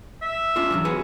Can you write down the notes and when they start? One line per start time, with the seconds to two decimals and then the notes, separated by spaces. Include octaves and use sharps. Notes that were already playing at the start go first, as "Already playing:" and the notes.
0.22 E5
0.56 C#4 D4 F4
0.71 E2 E3 F#3
0.85 F#4 G#4 B4